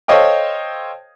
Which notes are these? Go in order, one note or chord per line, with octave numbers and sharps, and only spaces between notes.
A4 C5 C#5 D#5 F5 G5